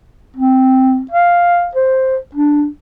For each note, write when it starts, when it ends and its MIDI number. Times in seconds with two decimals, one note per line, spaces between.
0.37 1.02 60
1.11 1.69 77
1.75 2.17 72
2.35 2.67 62